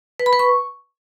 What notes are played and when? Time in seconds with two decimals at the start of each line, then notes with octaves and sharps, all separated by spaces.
0.20 B4
0.26 B5
0.33 B4
0.39 C#6